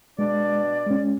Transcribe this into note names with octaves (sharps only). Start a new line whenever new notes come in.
B2 G#3 D4 D5
G#3 C#4